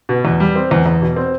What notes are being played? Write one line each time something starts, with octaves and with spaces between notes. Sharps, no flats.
B2
E2
G3
C4
E2
E2
B2
C4